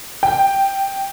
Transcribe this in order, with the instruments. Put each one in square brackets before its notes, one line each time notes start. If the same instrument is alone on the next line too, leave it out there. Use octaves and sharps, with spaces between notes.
[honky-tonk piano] G5